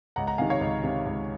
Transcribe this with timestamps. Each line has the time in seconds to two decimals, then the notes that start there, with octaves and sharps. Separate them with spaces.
0.16 C#2 F#5 A#5
0.27 F#5 A#5
0.38 C3 D#3 F5 G#5
0.50 C#5 F5
0.61 C#2
0.84 C3 D#3
1.05 C#2